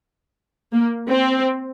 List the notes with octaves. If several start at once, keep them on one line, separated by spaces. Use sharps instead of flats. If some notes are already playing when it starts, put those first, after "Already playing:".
A#3
C4